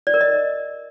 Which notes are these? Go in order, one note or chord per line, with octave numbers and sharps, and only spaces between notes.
D5
A#4
D#5